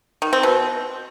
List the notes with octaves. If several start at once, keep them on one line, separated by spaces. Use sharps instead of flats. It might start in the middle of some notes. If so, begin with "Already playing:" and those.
D#3
C4
B2